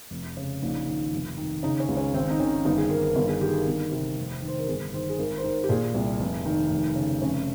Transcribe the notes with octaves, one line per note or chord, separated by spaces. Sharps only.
F1
C#3
A#1 D#4
D#3
F1
D#3
C#3 D#4
C#4
C#2
C#4
G#1 C4
D#4
D#3 C#4
G1 D#4
G#4
D#3 A#4
A#4
G1 A#4
G#4
D#3 G4
G#4
A#4
G1
C3
F1
D#3
C5
A#4
G1 G#4
D#3 C5
G#4
G#1 A#4
C5
D#3 A#4
G4
A#2 G#4
C2
F1
D#3
F1
C#3
F1 C#4